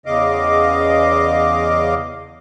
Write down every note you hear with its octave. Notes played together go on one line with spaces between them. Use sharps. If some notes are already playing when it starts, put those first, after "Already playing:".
E2 C#3 D#5 F5 D6